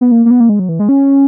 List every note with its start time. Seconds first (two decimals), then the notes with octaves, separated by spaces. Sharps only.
0.01 B3
0.11 A#3
0.26 A#3
0.31 B3
0.40 A#3
0.49 G#3
0.59 F#3
0.69 E3
0.79 G#3
0.89 C#4